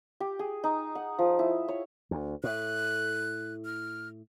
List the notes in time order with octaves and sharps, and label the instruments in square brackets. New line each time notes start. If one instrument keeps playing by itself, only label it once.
[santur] G4
G#4
D#4
F#5
F3
E4
C#5
[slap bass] D2
[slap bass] A2 [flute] F#6
[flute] F6